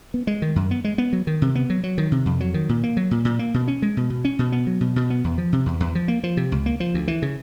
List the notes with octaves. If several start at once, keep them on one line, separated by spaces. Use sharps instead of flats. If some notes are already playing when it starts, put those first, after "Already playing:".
B3
G#3
D#3
F#2
B3
G#3
B3
F#3
D#3
C3
B3
F#3
F#3
D#3
C3
F2
F#3
D#3
A#2
A#3
F#3
A#2
A#2
A#3
B2
C#4
G#3
B2
B2
C#4
B2
B3
F#3
B2
B2
B3
E2
F3
C3
E2
E2
F3
A#3
F3
C3
C#2
A#3
F3
D2
E3
C#3